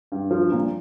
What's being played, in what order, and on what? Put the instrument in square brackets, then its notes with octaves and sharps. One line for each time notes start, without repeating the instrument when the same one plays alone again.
[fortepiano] G2
F3
A#2